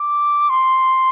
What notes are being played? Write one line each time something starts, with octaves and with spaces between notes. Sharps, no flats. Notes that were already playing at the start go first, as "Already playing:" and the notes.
Already playing: D6
C6